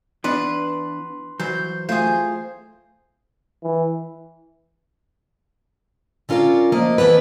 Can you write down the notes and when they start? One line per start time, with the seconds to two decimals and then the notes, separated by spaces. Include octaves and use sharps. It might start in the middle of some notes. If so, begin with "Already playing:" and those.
0.24 E3 B3 D4 B4 C6
1.40 E3 F#3 C5 G6
1.89 A3 C4 F4 G#4 C5
3.64 E3
6.29 D3 C#4 F4 A#4 D5
6.72 F3 A3 A#3 D#5
6.98 F2 E3 A3 B3 B4